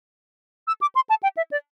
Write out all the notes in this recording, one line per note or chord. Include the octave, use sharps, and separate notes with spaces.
E6
D6
C6
A5
G5
E5
D5